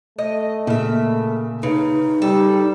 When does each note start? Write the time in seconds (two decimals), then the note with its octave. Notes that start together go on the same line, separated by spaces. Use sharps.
0.19 A3 D#5
0.67 A#2 C#3 E5
1.63 C#3 D#4 B4
2.22 G3 A4